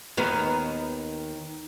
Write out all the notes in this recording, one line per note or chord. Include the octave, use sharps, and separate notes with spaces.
D#2 D#3 B3